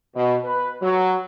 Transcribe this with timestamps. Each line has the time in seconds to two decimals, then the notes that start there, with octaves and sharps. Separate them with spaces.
0.15 B2
0.44 B4
0.82 F#3